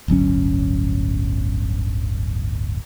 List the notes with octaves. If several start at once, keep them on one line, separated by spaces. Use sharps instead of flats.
D1 G1 F#3 C#4